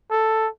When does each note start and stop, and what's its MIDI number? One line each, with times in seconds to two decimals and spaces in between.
0.11 0.48 69